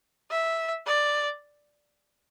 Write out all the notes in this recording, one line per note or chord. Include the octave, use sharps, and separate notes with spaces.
E5
D5